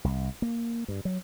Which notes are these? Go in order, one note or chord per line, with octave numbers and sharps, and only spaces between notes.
C2
A#3
G2
F#3